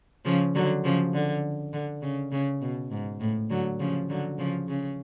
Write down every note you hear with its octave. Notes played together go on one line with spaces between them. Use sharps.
C#3 F3
D3 F#3
C#3 F3
D3
D3
C#3
C#3
B2
G#2
A2
D3 F#3
C#3 F3
D3 F#3
C#3 F3
C#3